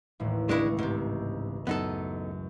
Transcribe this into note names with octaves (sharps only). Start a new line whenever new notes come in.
A1 D#2 A2
C#2 G#3 D4 E4 C#6
G#2 C3
F#2 B3 D#4 A4